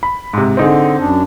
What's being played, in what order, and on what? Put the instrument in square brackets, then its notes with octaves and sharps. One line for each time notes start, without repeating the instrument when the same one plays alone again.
[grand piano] B5
G#2 C3
[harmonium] D3 [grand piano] C4 D#4 G#4
[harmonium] F#2 D4